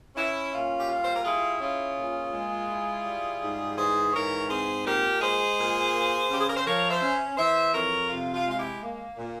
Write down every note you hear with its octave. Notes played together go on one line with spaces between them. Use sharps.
C#4 E4
A#2 F4
G4
G3 F4
C5
A#4
E4 F4 G#4
C#4 F4 G#4
A#2
G#3
E4
G3
G#2
E3 G#4 C5
G#2 A#4 C#5
C#5
C4 G#4 C5
A#2 G4 A#4
G#3 G#4 C5
A#2
A#3
C#3 G4
G#4
A#4
C5
F3 A#4 C#5
C5 E5
C#4
E3 C5 E5
F2 A#4 C#5
C3 F4
F4
G#3
F4
E4 G4
A#3
A#2